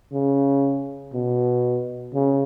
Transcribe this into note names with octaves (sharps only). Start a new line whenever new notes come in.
C#3
B2
C#3